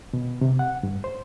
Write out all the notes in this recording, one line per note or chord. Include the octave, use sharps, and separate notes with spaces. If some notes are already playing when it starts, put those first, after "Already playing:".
B2
C3
F#5
G2
C5